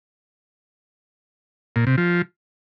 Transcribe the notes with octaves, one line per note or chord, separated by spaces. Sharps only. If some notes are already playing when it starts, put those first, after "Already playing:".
A#2
C3
F3